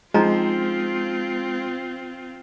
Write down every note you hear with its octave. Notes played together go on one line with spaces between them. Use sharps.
F3 G#3 C4 C#4 D#4 F4 A#5